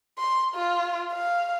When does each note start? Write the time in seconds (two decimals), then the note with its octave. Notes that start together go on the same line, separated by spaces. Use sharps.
0.18 C6
0.55 F4
1.13 F5